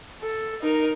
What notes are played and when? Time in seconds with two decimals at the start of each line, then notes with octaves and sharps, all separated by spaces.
0.22 A4
0.61 D#4 A#4